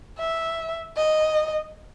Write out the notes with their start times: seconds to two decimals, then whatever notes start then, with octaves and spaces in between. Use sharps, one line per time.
0.18 E5
0.97 D#5